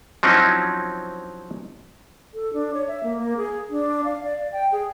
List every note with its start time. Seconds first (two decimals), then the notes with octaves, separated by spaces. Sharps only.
0.23 F3 F#3 C4 C#4 D#4 E4
2.34 A4
2.54 D4
2.74 C#5
2.88 E5
3.03 A#3
3.18 A#3
3.37 G#4
3.70 D4
4.04 F5
4.24 D5
4.52 G5
4.72 G#4